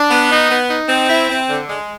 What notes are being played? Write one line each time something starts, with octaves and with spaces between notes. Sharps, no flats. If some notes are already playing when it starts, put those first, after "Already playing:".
Already playing: D4
B3
D#4
B3
D#4
C4
E4
C4
D3
G#3